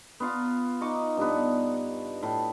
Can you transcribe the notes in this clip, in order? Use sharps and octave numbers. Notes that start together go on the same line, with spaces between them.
B3 F4 F5 A#5
D#4 D#5 C#6 D6
G2 B3
A2